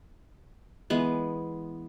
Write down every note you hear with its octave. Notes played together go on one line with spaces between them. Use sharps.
E3 G#3 B3